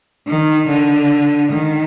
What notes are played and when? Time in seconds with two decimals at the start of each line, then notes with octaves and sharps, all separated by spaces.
0.27 D#3
0.69 D3
1.52 D#3